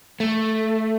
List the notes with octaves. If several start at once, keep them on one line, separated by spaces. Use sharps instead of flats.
A3